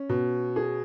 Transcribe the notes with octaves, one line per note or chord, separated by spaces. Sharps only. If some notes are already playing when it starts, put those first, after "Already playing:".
Already playing: C#4
B2
G#4